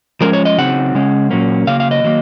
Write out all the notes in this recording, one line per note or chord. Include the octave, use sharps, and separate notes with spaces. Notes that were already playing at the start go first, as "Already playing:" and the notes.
F3 G#3 C#4 A#4
C#5
D#5
C#3 F#3 C4 D#4 F#5
C#3 G#3 C#4
A#2 F#3 A#3 C#4
C#3 F#3 A#3 F5
F5
D#5
D#3 F#3 A#3